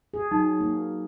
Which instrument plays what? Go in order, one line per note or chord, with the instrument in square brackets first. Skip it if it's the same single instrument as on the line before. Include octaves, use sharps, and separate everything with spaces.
[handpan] G#4
[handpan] F#3 [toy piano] D#4
[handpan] A#3